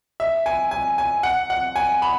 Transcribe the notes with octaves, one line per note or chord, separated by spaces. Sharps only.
E5
G#5
G#5
G#5
F#5
F#5
G#5
B5